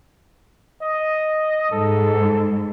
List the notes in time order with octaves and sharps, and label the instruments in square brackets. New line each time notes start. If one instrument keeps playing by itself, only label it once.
[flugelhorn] D#5
[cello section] G#2 [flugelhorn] A4